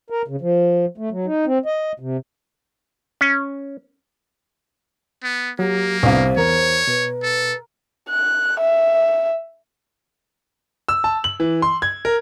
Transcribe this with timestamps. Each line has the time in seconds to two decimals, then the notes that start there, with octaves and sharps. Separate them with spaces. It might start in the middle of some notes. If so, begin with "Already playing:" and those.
0.10 A#4
0.28 C#3
0.41 F3
0.98 A3
1.11 F#3
1.26 D#4
1.46 C4
1.66 D#5
2.00 C3
3.21 C#4
5.23 B3
5.59 F#3 A#3 G4
6.03 C2 B3 D4 C5 F5
6.37 E2 A#4 C#5
6.87 B2 B4
7.23 A4
8.10 F#6
8.61 E5
10.88 E6
11.04 A5
11.24 F#7
11.40 E3
11.62 C6
11.82 G#6
12.05 A#4